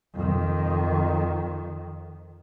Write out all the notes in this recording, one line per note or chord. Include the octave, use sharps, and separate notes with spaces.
F2 D#3